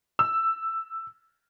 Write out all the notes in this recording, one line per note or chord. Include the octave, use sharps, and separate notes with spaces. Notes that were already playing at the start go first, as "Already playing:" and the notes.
E6